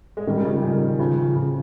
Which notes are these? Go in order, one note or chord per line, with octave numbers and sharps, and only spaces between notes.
G#3
D#3 G3
G3
C#3 F3
D#3
C#3 F3
C#3 F3